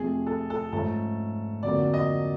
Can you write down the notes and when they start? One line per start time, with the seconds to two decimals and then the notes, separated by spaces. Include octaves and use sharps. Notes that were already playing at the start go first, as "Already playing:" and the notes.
Already playing: F2 C3 F3 A3 G#4
0.27 A4
0.50 A4
0.72 G#2 F3 A3 C#4 A4
1.63 F2 D3 F#3 A#3 D5
1.93 D#5